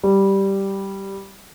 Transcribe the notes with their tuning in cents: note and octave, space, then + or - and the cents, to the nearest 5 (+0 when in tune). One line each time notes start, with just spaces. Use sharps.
G3 -5